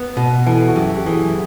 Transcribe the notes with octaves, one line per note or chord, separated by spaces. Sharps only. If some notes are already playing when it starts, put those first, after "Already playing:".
Already playing: B3
B2
E3 A4
F#4
F#2 G4
G4
E3 G#4